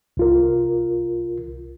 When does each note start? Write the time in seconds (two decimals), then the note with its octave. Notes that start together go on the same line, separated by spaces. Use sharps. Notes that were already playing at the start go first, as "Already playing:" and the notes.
0.17 C2 F4 A#4